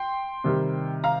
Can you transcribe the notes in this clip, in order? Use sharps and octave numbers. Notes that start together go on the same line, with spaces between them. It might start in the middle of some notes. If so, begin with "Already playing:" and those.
Already playing: G5 C6
C3 D#3 G3
F5 A#5